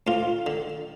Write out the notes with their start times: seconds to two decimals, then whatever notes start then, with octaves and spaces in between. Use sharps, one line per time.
0.07 D2 F4
0.46 D3